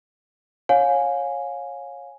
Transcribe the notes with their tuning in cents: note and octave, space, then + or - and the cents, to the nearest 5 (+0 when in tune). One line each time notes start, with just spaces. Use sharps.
C#5 -15 F5 +30 G#5 +0